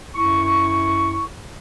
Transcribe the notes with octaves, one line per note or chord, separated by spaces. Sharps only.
F#2 E4 C#6